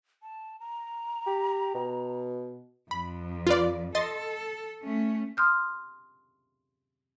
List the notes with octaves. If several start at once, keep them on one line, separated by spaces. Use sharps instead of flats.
A5
A#5
G4
B2
F2 B5
F4 B4 D5
A4 D#5 C6 A6
A3 C#4
C6 D#6 F6 G6